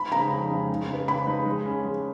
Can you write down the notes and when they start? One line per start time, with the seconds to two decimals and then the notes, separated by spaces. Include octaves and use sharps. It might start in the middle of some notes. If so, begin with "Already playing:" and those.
Already playing: B5
0.12 C#3 G#3 D#4 A#5
0.31 F2
0.51 C#3 G#3 D#4
0.70 C#3
0.88 G#3 D#4 G#4 B4
1.08 C#3 B5
1.27 G#3 D#4 G#4 B4
1.46 G#3
1.66 C#4 G#4
1.84 G#3